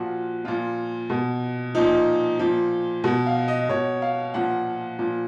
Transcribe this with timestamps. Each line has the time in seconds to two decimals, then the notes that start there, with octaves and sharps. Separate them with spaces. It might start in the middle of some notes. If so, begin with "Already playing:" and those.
Already playing: A#2 F3 F#4
0.44 A#2 F3 F4
1.10 B2
1.75 A#2 F3 D#4
2.39 A#2 F3
3.04 B2 F#4
3.26 F5
3.48 D#5
3.69 B2 C#5
4.02 F5
4.34 A#2 F3 F#5
4.99 A#2 F3